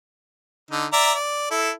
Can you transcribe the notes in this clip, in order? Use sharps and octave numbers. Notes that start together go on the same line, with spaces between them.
D3 D#4
D5 E5 A#5
D5
E4 A4